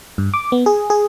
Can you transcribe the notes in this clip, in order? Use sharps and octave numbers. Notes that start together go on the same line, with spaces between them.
G2
D6
B3
G#4
G#4